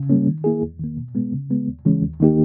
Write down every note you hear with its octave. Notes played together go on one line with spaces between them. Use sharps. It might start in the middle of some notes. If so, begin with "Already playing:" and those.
Already playing: C#3
G3 A#3 C#4
D#3
A#3 E4 G#4
E2
D#3 A#3
B2
G#3 B3
C#3
G#3 B3
D#2
C#3 E3 G#3 C#4
D#2
D#3 A#3 D#4 G4